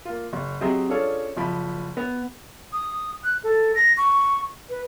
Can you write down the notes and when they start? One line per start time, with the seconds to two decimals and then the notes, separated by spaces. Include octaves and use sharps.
0.05 A#3 F4
0.33 F#1
0.61 F#3 C4 G4 G#4 D#5
0.89 C#4 D4 F4 G#4 A4 C#5
1.37 F#1 F3 B5
1.97 B3
2.73 D#6
3.24 F#6
3.44 A4
3.75 A#6
3.97 C#6
4.70 B4